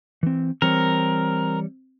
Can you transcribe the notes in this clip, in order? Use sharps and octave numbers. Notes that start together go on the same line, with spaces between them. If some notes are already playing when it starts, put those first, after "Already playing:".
E3 C4
E3 G3 C4 A#4 C#5